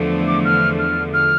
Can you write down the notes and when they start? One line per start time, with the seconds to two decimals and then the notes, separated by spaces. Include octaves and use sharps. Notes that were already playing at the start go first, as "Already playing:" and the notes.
Already playing: E2 D3 F3 A3
0.28 D6
0.45 F6
0.79 F6
1.14 F6